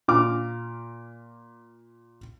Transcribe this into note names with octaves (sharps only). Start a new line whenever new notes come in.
A#2 D6 F6